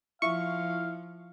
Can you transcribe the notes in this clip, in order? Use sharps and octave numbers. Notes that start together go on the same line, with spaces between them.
F3 E4 E5 F5 C#6